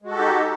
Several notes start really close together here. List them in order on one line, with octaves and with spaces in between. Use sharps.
G#3 F#4 A4 G4 D#4